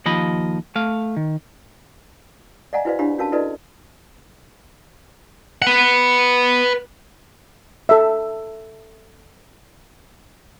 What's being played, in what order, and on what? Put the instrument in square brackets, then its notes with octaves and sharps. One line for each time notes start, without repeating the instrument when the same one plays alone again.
[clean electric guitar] D#2 F3 D#5 B5
A3 F5
D#3
[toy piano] D5 D#5 F5 F#5 G#5 A#5
E4 F#4 B4 C5 D5 F5
D4 E4 G4 C#5 F5 B5
C#4 F#4 A#4 F5 A5
E4 F#4 A4 B4 D5 D#5
[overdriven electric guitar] B4 F#5
[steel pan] A4 E5